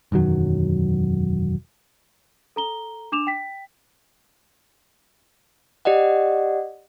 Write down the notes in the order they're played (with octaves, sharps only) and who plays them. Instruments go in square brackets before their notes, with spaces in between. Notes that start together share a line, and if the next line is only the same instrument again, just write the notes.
[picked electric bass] E1 F#2 D#3 F#3
[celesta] A4 A#5 G7
D4 D6 E7 F7
G5 B6
[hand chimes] G4 D5 D#5 F#5